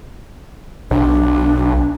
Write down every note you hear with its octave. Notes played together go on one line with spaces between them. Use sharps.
B1 D4